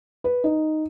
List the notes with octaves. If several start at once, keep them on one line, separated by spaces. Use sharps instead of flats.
B4
D#4